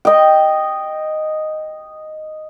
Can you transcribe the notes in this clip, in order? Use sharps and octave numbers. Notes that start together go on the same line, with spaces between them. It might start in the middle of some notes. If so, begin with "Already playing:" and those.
D#5 G5